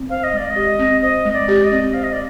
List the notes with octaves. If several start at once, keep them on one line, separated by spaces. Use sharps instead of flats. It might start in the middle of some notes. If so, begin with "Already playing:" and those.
Already playing: C4
C5 F5
D#5
G#3 D5
D#5
G4
C4
C5 D#5
G#3
D5
G4
D#5
C4
C5 F5
D#5
D5